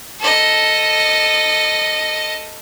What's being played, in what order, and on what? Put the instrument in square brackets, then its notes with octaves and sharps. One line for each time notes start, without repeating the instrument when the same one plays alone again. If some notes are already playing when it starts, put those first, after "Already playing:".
[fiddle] A4 D#5